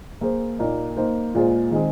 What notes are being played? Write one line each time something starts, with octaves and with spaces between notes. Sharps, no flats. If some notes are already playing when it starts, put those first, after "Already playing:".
A#3 G#4 C5
A#2 A#3 D#4
A#3 D#4 C5
A#2 G#3 F4 G#4 C5
D#3 G#3 C4 G#4